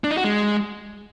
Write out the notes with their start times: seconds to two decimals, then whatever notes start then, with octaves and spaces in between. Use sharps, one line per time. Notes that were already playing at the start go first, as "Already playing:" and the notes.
0.04 D4
0.11 D#4
0.18 F#4
0.24 G#3